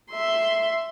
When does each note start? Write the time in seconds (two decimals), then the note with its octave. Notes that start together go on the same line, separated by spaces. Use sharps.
0.11 E5 C6